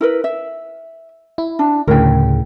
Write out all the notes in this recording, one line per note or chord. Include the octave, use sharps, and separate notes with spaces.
E4 A#4 B4
E5
E4
D4
D2 A2 C#3 A#4 G5